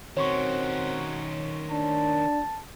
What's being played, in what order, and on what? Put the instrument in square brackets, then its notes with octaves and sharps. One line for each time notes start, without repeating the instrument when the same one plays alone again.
[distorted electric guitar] D#3 C#4 [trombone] C4 [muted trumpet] F#4 [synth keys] C#5 C6 C#6
[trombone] D4 [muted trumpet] A5